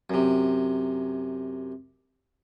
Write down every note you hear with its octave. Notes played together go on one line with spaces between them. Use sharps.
F#2 C3